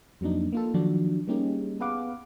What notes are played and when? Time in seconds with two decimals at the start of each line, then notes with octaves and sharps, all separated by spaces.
0.21 F2 F#3 A#3 D4 D#4
0.53 A#3 F4 A4
0.74 D#3 F3 F#3 D4 F#4
1.27 G3 A#3 C#4 D#4 G4 G#4
1.80 B3 G#4 B4 F5 F#5 D6